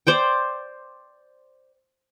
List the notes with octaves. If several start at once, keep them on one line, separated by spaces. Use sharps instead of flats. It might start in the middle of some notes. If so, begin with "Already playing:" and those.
C5 D5 G5